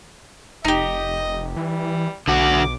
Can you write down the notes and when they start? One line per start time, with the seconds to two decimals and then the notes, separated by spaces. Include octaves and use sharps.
0.65 F1 D#4 G4 D#5
1.56 E3 G3
2.28 B1 D3 F#4 D6